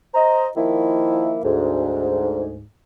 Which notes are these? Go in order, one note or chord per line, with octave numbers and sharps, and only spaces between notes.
C5 D#5 A#5
D#3 F3 A#3 E4
D2 G#2